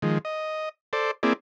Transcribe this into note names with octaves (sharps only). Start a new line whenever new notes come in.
D#3 F3 G#3
D#5
A4 C5 D5
A#3 C4 E4 G#4 D5